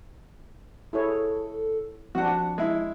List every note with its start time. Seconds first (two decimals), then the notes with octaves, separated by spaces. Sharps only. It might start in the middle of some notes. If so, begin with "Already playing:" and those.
0.93 E4 G#4 A4 C#5
2.15 F3 C4 D4 F#4 F#5
2.58 G#3 E4